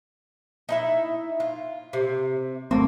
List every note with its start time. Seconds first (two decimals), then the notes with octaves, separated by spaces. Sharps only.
0.69 D#4 E4 E5
1.40 F4
1.93 C3
2.71 G1 A3 A#3 C4